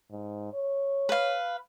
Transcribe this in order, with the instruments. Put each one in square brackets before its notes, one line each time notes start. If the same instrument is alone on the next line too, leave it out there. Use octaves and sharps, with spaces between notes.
[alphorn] G#2
C#5
[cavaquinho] B4 F5